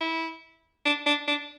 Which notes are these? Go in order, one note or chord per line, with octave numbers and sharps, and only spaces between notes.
E4
D4
D4
D4